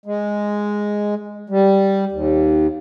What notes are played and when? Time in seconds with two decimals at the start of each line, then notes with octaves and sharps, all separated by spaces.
0.06 G#3
1.50 G3
2.12 D#2